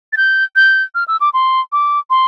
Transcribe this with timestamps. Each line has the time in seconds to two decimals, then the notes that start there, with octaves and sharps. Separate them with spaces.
0.12 A6
0.17 G6
0.56 G6
0.95 F6
1.08 E6
1.20 D6
1.33 C6
1.72 D6
2.10 C6